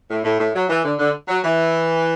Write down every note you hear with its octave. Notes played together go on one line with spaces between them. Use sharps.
A2
A2
A2
F#3
E3
D3
D3
F#3
E3